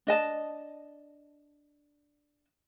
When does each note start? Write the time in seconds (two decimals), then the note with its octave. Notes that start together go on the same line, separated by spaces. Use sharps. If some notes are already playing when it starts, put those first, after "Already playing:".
0.07 D4 D#5 A5